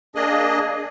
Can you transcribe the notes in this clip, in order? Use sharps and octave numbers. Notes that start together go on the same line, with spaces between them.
A#3 D4 G#4 D#5